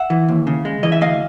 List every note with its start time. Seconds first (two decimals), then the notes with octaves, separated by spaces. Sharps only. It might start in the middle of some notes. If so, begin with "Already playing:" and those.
Already playing: E5 F#5
0.10 E3
0.28 D#2
0.47 C#3
0.65 G#3
0.83 E3 D#5
0.92 E5
1.01 D2 D#5 F5